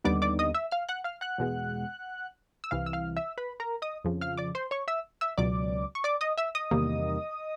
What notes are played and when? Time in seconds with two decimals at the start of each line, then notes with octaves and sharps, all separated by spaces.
0.04 D#2 D3 G3 B3 D#4 D5 D6
0.22 D5 D6
0.39 D#5 D#6
0.54 E5 E6
0.71 F5 F6
0.89 F#5 F#6
1.04 F5 F6
1.21 F#5 F#6
1.38 E2 B2 G#3 B3
2.64 E6
2.71 C2 C3 E3 F5 F6
2.86 E6
2.93 F5 F6
3.16 E5 E6
3.38 B4 B5
3.60 A#4 A#5
3.82 D#5 D#6
4.04 F2 C#3 F3
4.21 F5 F6
4.37 D5 D6
4.55 C5 C6
4.71 C#5 C#6
4.88 E5 E6
5.21 E5 E6
5.38 C#2 B2 F#3 D5 D6
5.95 C#6
6.04 D5 D6
6.21 D#5 D#6
6.38 E5 E6
6.55 D#5 D#6
6.71 E2 C3 D#3 G3 A#3